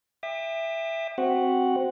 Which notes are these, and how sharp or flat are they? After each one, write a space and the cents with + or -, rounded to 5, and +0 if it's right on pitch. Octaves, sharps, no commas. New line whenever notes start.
E5 +5 G5 +35 D6 +45
C4 +0 F#4 +0 F#5 +0